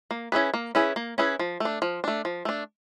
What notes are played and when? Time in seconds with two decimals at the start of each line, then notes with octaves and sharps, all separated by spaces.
0.11 A#3
0.32 C#4 E4 G#4 B4
0.54 A#3
0.75 C#4 E4 G#4 B4
0.96 A#3
1.18 C#4 E4 G#4 B4
1.39 F3
1.60 A3 D4
1.82 F3
2.04 A3 D4
2.25 F3
2.45 A3 D4